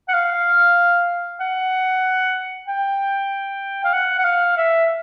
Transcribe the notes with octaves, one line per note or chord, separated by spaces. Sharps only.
F#5
F5
F#5
G5
F5
F#5
F#5
F5
E5